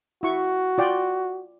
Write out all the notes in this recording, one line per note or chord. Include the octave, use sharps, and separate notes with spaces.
E4 F#4 C#6
F4 D5 G5